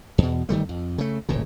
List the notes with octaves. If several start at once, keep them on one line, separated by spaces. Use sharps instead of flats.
E2 B2
G1 D#3 G3 A3
F2
C#3 A3
D1 G#1 A#2 C#3